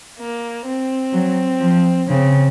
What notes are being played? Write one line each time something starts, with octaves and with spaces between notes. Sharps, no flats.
A#3
C4
F#3
F3
C#3 C4